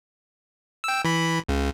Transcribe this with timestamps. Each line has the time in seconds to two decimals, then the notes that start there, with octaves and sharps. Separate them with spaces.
0.84 G5 E6
1.05 E3 B5
1.49 C#2 C#3